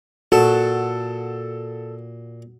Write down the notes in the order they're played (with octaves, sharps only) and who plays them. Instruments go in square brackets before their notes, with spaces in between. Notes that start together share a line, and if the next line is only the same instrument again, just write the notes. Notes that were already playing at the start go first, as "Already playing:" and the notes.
[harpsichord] A#2 A5 [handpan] F#4 [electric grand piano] A4